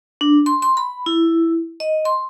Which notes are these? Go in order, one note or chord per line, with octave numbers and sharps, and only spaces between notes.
D4
C6
C6
B5
E4
D#5
C6